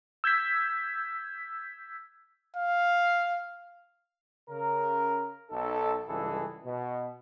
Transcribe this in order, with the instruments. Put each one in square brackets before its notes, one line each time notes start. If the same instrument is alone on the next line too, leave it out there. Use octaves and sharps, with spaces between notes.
[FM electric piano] E6 G6 G#6 B6
[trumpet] F5
[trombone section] C#3 A#4
B1 D#4 A4
C#2 G2 E3 G#4 A4
B2